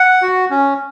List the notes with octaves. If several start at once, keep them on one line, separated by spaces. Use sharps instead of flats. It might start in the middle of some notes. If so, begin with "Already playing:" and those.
Already playing: F#5
F#4
C#4